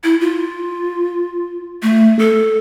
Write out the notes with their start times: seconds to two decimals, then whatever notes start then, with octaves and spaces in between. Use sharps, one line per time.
0.04 E4
0.21 F4
1.82 A3
2.19 A4